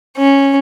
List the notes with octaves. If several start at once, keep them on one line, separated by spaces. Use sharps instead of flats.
C#4